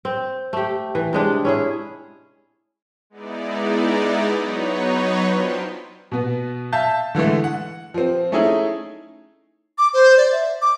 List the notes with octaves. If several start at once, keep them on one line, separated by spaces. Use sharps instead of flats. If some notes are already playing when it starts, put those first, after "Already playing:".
C4
A3 G4
E3
C3 G#3 D4
C#4 E4 G#4
G#3 B3 D#4 E4 D5
F#3 B3 D#4 B4 C#5
D4 F4 C5 G5 C6
B2 B3
E5 F5 A5 G6
D3 E3 G#3 A3
F#5
F3 C4
A3 C#4 D#4 E4 G#4
D6
C5
D5
E5
D6